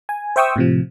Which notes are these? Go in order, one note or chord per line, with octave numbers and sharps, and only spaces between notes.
G#5
C5 E5 G5 C#6 D#6 E6
A2 C3 F3